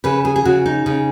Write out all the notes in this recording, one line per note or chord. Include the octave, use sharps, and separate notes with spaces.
C#3 B4
G#4
G#4
C#3 F#4
D#4
C#3